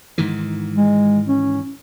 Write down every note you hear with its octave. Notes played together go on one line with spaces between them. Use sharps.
G#2 D#3 E3
G#3
C#4